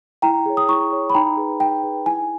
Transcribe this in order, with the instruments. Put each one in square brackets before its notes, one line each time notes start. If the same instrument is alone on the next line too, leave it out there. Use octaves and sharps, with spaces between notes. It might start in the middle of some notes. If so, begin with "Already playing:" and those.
[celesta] E4 G5 A#5
G#4 C#5
D#6
E4 A#5 C#6
G#4 C#5
B5
D#4 G5 A#5
G#4 B4
D#4 G5
G#4 B4
E4 G#5